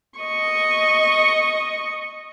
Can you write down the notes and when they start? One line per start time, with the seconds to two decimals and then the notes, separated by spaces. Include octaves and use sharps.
0.19 D#5 C#6